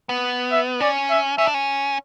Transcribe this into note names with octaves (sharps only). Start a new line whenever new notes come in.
B3
E5
C#4 D5
E5
C#4 E5
D4
C#4